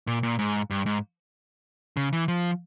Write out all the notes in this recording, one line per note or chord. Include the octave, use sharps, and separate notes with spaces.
A#2
A#2
G#2
G2
G#2
C#3
E3
F3